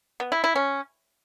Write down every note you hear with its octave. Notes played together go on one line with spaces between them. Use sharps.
B3
E4
E4
C#4